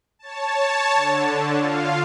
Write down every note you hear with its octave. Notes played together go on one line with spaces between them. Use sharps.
C#5 A5
D3
F4 F5